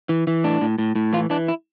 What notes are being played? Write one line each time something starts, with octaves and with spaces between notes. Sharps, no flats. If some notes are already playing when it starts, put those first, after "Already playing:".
E3
E3
A2 D4
A2
A2
A2
E3 F4
E3 D4
E4